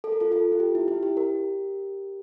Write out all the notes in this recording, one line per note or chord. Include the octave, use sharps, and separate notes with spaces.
A4
A#4
F4 A4
F4 A4
F4
G4
E4
E4
G4
G4 A#4